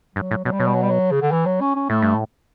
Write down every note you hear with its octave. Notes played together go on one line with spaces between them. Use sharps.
G2 F#3
A2
B2 F#3
G3
B2 F#3
G3
F#3
G3
F#3
C#3
D3
E3
F#3
C#4
C#4
A2 A3
G2
A2